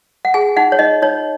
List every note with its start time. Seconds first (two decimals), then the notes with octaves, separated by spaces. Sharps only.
0.25 F#5
0.34 G#4 G#5
0.57 D#4 F#5
0.72 C#5
0.79 D#4 D#5
1.02 D#4 C#5